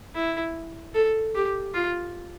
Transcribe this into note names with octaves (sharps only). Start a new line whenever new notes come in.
E4
A4
G4
F4